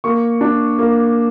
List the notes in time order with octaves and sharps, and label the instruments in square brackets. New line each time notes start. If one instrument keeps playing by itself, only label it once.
[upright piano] A#3 C#6
D4
A#3